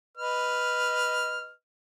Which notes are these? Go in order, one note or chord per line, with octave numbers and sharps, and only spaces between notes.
B4 D#5 F6